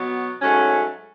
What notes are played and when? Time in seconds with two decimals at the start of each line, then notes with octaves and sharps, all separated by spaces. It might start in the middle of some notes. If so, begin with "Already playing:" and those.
Already playing: B2 F#3 B3
0.41 G#2 F#3 A3 C#4